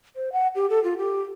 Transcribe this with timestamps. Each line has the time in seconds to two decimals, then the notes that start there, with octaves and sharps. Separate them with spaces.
0.16 C5
0.32 F#5
0.55 G4
0.70 A4
0.84 F4
0.98 G4